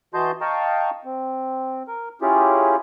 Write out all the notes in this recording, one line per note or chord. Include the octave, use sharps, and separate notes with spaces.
E3 F#4 D#5 A5 C6 G6
D#5 F5 G5 A5 A#5 C#6
C4
A#4
C#4 E4 F4 G4 G#4